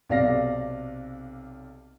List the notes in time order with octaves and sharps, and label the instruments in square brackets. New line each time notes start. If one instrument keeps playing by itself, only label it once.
[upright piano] B1 C3 D5 F5 A#6